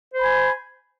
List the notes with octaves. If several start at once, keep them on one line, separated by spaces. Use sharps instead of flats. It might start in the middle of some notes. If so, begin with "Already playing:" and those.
C5 G#5 B5